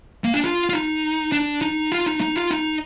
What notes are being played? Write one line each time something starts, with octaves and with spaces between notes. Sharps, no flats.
A#3
D4
F4
F4
D#4
D4
D#4
F4
D#4
D#4
F4
D#4